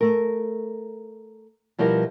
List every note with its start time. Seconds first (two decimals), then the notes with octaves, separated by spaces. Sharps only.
0.01 A3 A#4
1.78 B2 F3 G3 E4 A#4